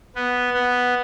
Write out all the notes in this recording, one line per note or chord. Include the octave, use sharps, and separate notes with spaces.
B3
B3